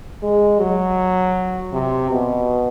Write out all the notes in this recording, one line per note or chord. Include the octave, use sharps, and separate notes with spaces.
G#3
F#3
C3
B2